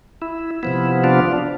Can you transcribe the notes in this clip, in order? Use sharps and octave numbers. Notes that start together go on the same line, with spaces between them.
E4
C3 F3 B3 E4
D4 F4